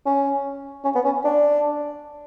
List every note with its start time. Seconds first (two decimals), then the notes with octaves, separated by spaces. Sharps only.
0.06 C#4
0.84 C#4
0.95 B3
1.05 C#4
1.24 D4